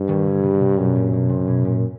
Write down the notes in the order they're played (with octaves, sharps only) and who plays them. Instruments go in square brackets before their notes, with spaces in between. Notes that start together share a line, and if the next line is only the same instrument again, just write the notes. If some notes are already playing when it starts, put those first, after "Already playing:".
Already playing: [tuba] G2
[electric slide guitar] D#3
D3
C#3
C3
[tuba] F#2 [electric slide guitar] B2
[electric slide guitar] A#2
B2
C3
B2
A#2